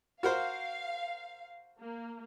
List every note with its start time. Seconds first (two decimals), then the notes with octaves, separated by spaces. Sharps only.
0.23 F#4 A#4 C5 F5
1.81 A#3